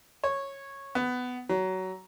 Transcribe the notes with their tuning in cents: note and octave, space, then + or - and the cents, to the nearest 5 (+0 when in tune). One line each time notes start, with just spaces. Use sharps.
C#5 -10
B3 +15
F#3 +20